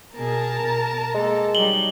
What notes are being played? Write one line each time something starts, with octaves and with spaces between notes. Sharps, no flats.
B2 G#4 A#4 A5 A#5
B2
G#3 A#3 A4
F#3 G3 D#4 F#7 G7